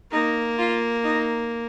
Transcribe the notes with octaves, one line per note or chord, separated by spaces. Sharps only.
A#3 D#4
F4
D#4